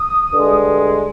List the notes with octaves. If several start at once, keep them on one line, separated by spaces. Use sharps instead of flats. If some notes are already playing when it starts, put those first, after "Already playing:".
Already playing: D#6
G2 D3 G#3 D4